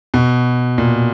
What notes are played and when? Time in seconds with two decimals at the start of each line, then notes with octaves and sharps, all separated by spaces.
0.14 B2
0.78 A#2